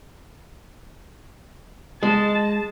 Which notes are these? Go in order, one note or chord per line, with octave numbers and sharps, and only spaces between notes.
G#3 A5